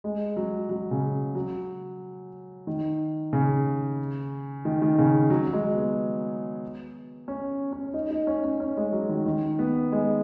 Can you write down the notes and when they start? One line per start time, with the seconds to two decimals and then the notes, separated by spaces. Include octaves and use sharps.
0.04 G#3
0.37 F#3
0.69 F#3
0.91 C#3
1.35 F#3
2.67 D#3
3.33 C#3
4.65 D#3
4.82 D#3
4.98 C#3
5.30 F#3
5.47 F#3
5.53 G#3
5.74 B3
7.28 C#4
7.72 C#4
7.94 D#4
8.10 D#4
8.27 C#4
8.44 C#4
8.60 C#4
8.77 G#3
8.93 F#3
9.09 D#3
9.26 D#3
9.59 B3
9.92 G#3